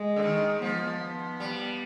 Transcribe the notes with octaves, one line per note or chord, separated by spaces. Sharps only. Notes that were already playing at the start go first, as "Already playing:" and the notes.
Already playing: G#3
D3
D#3
F3 B3
G3